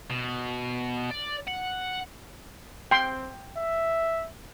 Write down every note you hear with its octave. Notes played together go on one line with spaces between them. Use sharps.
B2
D5
F#5
C4 G5 C6
E5